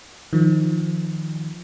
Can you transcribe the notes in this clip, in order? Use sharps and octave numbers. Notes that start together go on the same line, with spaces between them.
D#3 F3